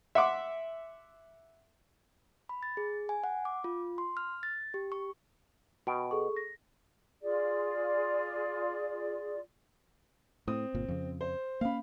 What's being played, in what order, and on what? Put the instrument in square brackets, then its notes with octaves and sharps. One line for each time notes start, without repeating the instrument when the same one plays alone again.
[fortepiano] E5 F#5 C6 D6
[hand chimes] B5
A6
G#4
G#5
F#5
D6
F4
C6
F6
A6
G4
C#6
[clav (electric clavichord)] B2 [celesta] F#4 G5 D7
[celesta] G#4 A4 C#6
A#6
[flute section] F4 G#4 D5
[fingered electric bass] A2 [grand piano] C4 D#6
[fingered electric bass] G1 A#2
F2 C#3
[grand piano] C5
[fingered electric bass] A#3 C#4 [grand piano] F5 B5